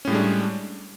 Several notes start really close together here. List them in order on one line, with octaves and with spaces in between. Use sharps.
C#4 A2 G3 G#3 D4